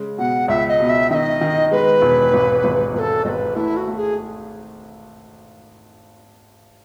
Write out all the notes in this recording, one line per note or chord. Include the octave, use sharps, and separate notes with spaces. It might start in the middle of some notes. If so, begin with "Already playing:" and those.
Already playing: C#3 G#3
B2 F#5
C#2 E5
D#5
B2
E5
D#3 D#5 E5
D#3
G#3 B4
E1
G#1
G#1
G#1 B4
A4
G#1 B4 D#5
A3 E4
F#4
A3
G#4